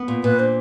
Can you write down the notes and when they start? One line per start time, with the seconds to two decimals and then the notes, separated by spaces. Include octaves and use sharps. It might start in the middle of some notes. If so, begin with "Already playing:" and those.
Already playing: B3
0.08 A#2
0.23 A#2 B4
0.39 D4 C5